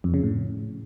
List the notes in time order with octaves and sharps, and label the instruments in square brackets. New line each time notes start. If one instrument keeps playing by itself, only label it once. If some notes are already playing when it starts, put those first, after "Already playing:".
[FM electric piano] F2
C#3
A2